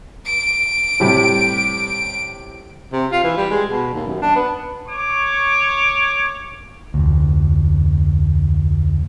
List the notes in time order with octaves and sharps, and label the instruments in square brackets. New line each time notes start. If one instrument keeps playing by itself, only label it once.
[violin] D7
[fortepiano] A2 C3 G3
[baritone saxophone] C3
F4
E3
G3
G#3
B2
D#2
F#2
D4
B3
[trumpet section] C#5 C#6 D6
[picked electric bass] F1 D2